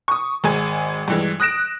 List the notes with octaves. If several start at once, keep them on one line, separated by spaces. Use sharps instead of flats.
C#6 D#6
G#1 G#3 G#5
G2 E3 G#3
D#6 F#6 A#6 D7 E7